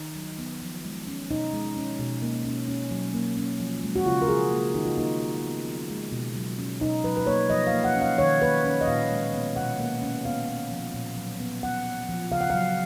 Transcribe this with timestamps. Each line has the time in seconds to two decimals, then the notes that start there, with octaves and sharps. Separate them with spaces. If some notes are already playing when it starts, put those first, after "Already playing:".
Already playing: D#3 D#4
0.15 F#3
0.39 B3
0.62 F3
0.85 G#3
1.07 C#4
1.30 B2 D#4
1.53 G#3
1.77 C#4
1.99 B2
2.22 A#3
2.45 C#4
2.68 C#4
2.91 F#3
3.14 A#3
3.37 C#4
3.60 F3
3.83 G#3
3.96 F#4
4.06 C#3 F4
4.22 A#4
4.28 F3 G#4
4.51 A#3
4.75 D#3 D#4
4.86 F4
4.97 A#3 D#4
5.21 C#4
5.44 B3
5.67 F3
5.90 G#3
6.12 B2
6.35 F#3
6.58 C#4
6.81 B2 D#4
7.04 F#3 B4
7.17 B4
7.27 A#3 C#5
7.50 F3 D#5
7.67 F5
7.73 A#3
7.84 F#5
7.95 C#4
8.01 F5
8.18 D#3 C#5
8.42 A#3 B4
8.65 C#4
8.81 D#5
8.88 A#2 F5
9.11 G#3
9.33 B3
9.56 B2 F#5
9.80 A#3
10.02 C#4
10.25 B3 F5
10.48 B3
10.71 F3
10.94 A#2
11.17 F#3
11.40 B3
11.63 B3 F#5
11.86 B3
12.09 F3
12.31 C#3 F5
12.41 F#5
12.50 F#3 F5